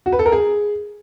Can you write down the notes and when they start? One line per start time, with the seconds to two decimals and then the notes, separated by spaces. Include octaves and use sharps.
0.06 F#4
0.13 B4
0.19 A4
0.26 A#4
0.32 G#4